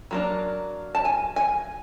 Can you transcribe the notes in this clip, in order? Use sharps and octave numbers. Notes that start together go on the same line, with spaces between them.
F#3 A#3 D4
A5
G#5
G#5